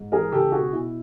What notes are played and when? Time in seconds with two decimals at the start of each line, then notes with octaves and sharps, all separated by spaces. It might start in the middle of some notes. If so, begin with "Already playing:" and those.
Already playing: G#2
0.12 E3 G#4 A#4
0.32 C#2 G4 A4
0.52 B2 F#4 G#4
0.72 B2 E4